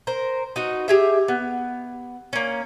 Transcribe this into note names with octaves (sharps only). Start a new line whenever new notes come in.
A#4 C5
D#4 F#4 B4
G4 G#4 E5
B3
A#3 C#4